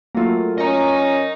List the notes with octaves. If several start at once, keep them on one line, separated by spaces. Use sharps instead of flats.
F#3 A3 A#3 F4
C#4 A#4 D#5 A#5 C#6